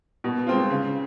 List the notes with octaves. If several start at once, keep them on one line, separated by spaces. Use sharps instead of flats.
B2
G#3 C4 F4
C#3